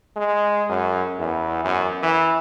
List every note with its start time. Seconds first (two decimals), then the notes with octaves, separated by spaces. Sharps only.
0.16 G#3
0.69 F#2
1.19 E2
1.64 F#2
2.03 E3